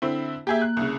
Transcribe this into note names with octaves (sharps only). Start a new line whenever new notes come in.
D3 C4 E4
A#3 G4 G#4 E5
F#6
C2 C#3